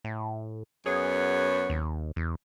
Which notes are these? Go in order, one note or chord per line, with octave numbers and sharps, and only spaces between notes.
A2
F#2 B3 G#4 C#5
D#2
E2